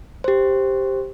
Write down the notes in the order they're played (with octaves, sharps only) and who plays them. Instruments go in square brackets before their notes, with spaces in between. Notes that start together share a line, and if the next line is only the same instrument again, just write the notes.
[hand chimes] G4 C5